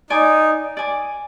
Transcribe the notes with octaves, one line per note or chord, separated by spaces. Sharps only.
D#4 D5 G#5 D6
D5 G#5 D6